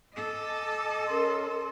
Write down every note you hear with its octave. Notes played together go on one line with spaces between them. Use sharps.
A4 D#5 G#5 D6
C#4 A#4 C6